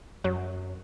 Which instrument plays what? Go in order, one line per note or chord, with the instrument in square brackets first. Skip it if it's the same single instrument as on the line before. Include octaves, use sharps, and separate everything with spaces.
[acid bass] F#2 [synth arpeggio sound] F#3